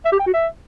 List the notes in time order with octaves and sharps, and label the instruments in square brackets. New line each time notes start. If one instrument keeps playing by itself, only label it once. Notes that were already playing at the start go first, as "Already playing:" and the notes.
[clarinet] E5
G4
G5
F#4
E5